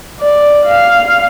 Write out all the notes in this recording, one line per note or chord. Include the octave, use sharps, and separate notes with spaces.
D5
F5